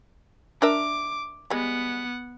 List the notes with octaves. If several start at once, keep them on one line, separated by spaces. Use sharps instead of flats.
D4 A#4 E5 D6
G3 G#3 B3 F#5